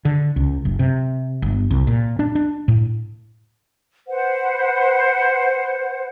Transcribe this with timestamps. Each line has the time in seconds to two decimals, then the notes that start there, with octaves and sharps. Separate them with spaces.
0.05 D3
0.36 C#2
0.65 F#1
0.79 C3
1.42 G1
1.71 C2
1.87 A#2
2.19 D4
2.35 D4
2.68 A2
4.07 B4 C5 F#5